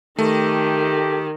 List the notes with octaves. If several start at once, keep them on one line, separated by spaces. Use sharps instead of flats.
D#3 A3 G4